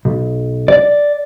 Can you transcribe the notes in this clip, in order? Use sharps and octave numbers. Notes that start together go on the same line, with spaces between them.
B1
D5